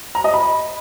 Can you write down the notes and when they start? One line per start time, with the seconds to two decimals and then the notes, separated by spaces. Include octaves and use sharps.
0.15 A#5
0.24 D#5
0.34 B5